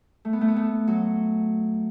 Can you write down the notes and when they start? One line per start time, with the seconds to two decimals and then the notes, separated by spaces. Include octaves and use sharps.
0.25 A3
0.33 B3
0.41 A3
0.48 B3
0.56 A3
0.87 F#3